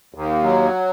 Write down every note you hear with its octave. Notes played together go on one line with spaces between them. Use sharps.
D#2
F#3